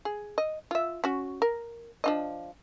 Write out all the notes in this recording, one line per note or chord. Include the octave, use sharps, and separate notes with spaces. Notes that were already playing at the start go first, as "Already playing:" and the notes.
G#4
D#5
F4 E5
C#4 F#4
A#4
F3 D4 D#5